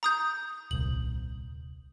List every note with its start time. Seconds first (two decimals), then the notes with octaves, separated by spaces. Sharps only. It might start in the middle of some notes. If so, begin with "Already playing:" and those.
0.03 A#5 D#6 G6
0.71 D#1 C2 F#7